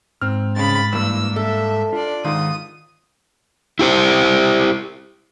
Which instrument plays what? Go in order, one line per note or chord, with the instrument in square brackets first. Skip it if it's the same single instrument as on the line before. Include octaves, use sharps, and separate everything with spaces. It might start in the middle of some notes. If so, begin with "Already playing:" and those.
[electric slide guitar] G#2 [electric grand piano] C4 F6
[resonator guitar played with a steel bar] G2 C#3 [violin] B5 A6
[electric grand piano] G2 A#3 [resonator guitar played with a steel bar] E3 [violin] E6
[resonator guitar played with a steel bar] A4 [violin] E5
[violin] D4 D5 [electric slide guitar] F4
[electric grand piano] G#2 [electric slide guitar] D#3 [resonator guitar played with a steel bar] F4 [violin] D#6
[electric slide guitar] E4 G4 C5